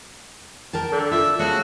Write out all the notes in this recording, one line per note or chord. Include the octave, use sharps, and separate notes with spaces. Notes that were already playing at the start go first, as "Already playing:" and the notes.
A#4 G5 A5
D3
F4 E5
C#3 A3 F#4